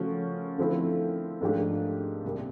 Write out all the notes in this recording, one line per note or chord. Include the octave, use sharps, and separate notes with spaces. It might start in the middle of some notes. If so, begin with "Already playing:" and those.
Already playing: C#3 F3 A3 C#4 F#4
D3 F3 A3 C4 E4
G#2 F3 A3 D4 G4
C2 A#2 G3 A#3